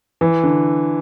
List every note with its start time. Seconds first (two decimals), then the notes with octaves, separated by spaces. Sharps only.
0.21 E3
0.43 D3